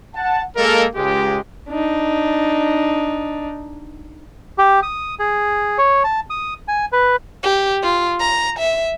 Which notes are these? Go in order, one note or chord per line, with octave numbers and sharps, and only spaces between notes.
F#5 A5
G#3 A#3 A4 A#4
C#2 G#3 G4
D4 D#4
G4
D#6
G#4
C#5
A5
D#6
G#5
B4
G4
F4
A#5
E5